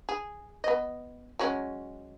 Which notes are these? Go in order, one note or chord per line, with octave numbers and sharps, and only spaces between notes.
G#4
B3 D#5
F#3 G#3 C#4